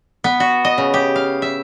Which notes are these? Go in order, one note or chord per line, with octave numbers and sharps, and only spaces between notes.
B3
F#4
D#5
C#3
G4
F5
E5